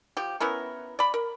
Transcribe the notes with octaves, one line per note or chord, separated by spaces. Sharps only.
F3 G4
B3 C#4 E4 A#4
D5 B5
A#4